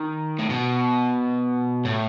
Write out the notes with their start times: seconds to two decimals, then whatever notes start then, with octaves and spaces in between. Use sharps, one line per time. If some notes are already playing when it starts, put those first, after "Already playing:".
Already playing: D#3
0.39 A2
0.50 B2
1.85 A2